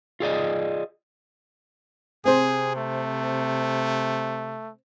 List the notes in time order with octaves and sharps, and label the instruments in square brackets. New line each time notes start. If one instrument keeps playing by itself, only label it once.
[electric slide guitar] F4 G#4 D5 D#5
[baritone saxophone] C3 [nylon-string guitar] C4 C5 [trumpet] G#4
[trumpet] A3